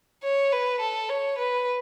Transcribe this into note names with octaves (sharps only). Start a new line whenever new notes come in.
C#5
B4
A4
C#5
B4